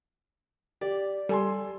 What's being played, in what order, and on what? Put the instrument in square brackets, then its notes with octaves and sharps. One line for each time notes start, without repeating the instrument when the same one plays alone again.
[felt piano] G4 [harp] D5
[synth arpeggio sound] G3 [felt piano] A4 G#5 C6